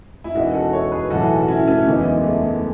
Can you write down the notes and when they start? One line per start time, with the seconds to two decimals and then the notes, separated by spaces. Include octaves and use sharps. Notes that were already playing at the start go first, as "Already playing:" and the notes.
0.24 E4
0.34 E1 E2 C#3 E3 D#4 F#4
0.54 F#4 A4
0.73 A4 C#5
0.92 G#4 B4
1.10 B1 A2 E3 F#4 A4
1.41 F#4
1.48 C#4 E4
1.67 A3 C#4
1.87 F#1 E2 C#3 E3 B3 D#4
2.06 G#3
2.24 A3
2.43 G#3